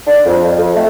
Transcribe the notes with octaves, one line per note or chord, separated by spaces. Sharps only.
D4
F2
F2
A3